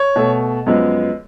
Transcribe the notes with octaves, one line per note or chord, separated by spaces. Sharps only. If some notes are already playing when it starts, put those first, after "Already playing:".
Already playing: C#5
B2 A3
F#2 F3 G#3 B3